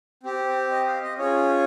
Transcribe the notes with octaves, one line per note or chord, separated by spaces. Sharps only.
C4 G4
D#5
F5
D#5
C#4 F4 G#4 C#5